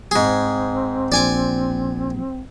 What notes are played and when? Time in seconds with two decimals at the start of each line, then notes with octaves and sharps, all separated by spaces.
0.11 G#2 C4 G#4
1.12 A#1 D5 G#5 D6